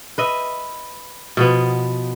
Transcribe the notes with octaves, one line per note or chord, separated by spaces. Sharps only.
B4 D#5 E5
B2 F3 B3